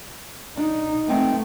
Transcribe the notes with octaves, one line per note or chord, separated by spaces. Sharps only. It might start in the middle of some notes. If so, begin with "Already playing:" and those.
D4 D#4
A3 B3 C4 D#4